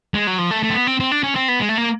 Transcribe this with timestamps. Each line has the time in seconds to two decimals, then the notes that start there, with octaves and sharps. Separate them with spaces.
0.14 G#3
0.27 F#3
0.38 F3
0.51 A3
0.63 A3
0.70 C4
0.74 B3
0.87 C4
1.00 C4
1.11 D4
1.23 C#4
1.36 C4
1.48 B3
1.60 G#3
1.69 A3
1.77 A#3